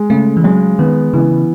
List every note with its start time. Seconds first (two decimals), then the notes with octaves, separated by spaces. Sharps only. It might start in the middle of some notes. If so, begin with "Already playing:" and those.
Already playing: G#3
0.10 C#3 A3
0.37 E3
0.44 F#3 G#3
0.79 D#3 B3
1.14 C#3 E3